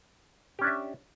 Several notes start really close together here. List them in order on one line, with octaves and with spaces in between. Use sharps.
G4 C#4 D4 E5